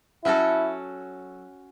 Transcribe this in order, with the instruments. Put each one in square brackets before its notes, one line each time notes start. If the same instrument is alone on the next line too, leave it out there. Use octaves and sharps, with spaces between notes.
[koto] F#3 C#4 F#4 A4 [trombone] E4